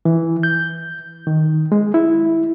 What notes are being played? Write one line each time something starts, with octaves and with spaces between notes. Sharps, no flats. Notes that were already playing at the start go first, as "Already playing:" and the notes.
E3
G6
D#3
G#3
E4